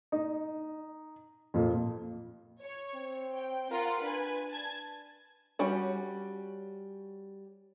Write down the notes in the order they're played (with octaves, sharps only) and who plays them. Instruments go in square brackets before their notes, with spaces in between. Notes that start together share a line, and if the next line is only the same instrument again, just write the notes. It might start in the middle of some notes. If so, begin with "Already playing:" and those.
[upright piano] D#4
F2 A#2
[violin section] C#5
[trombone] C4
[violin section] G5
[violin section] F4 F#5 [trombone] A#4
[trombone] D4 [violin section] B4 G#5
[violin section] A5 G#6
[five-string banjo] G3 C#4 F#4